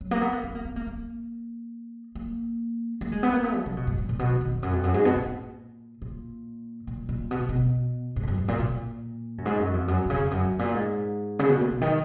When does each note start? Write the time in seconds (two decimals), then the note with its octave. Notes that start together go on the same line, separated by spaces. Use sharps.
0.01 F#3
0.11 A#3
0.22 B3
0.33 A#3
0.44 B3
0.55 A#3
0.65 B3
0.76 A#3
0.87 A#3
2.15 A#3
3.01 A#3
3.12 G#3
3.23 B3
3.33 A#3
3.44 B3
3.55 F3
3.66 C#3
3.77 B2
3.87 G#2
3.98 G#2
4.09 A#2
4.19 B2
4.30 D#3
4.41 D#3
4.52 F2
4.63 F#2
4.73 F2
4.83 F#2
4.94 G#2
5.05 B2
5.16 A#2
6.02 A#2
6.87 A#2
7.09 A#2
7.31 B2
7.40 A#2
7.49 B2
8.16 G#2
8.23 F2
8.28 F#2
8.38 G#2
8.48 A#2
8.59 A#2
9.38 F#2
9.45 G#2
9.59 F#2
9.74 F2
9.88 F#2
10.05 B2
10.10 C#3
10.20 F2
10.31 F#2
10.45 G#2
10.59 A#2
10.74 G#2
11.39 C#3
11.49 B2
11.60 A#2
11.71 B2
11.81 D#3